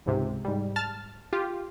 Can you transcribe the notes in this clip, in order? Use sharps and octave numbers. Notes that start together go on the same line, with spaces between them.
C#2 G#2 C3
G#2 G3
A5 F6 A6
F4 G4